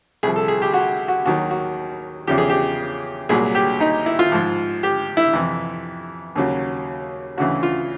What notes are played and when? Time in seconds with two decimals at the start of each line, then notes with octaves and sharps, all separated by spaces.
0.23 C2 C3 F3 G#4
0.36 A4
0.48 G#4
0.62 G4
0.74 F#4
1.08 F#4
1.25 D#2 D#3 F#3 F#4
1.51 F#4
2.27 E2 C#3 F3 G4
2.38 G#4
2.50 G4
3.29 C2 A#2 F#3 G#4
3.55 G4
3.80 D#4
4.06 E4
4.19 F4
4.32 G#2 F3
4.83 G4
5.17 E4
5.33 F2 C3 E3
6.35 D#2 C#3 F#3
7.38 D2 C#3 E3 F#4
7.63 F4